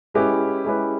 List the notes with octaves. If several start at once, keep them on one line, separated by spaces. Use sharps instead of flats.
G#3 C#4 E4 G4 B4
G#3 C#4 E4 G4 B4